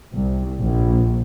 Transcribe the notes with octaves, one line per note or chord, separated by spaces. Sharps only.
C2
A#1